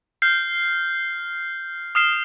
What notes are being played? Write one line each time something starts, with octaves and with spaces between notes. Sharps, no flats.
F6 G6 C7
D#6 F6 C7 E7